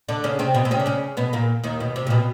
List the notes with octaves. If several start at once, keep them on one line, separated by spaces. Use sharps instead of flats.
D3 D4
C#3 C#4
C3 C4
B2 B3
C4
C#3 C#4
D4
C#3 C#4
B2 B3
A#2 A#3
D#2 D#3
B2
C3
A#2
B2